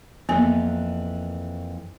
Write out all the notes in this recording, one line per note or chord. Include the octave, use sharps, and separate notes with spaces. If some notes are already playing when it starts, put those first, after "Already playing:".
F2 E3 A#3 B3 G#5